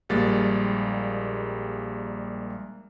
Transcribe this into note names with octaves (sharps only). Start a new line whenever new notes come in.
A#1 G3 G#3 A#3 A6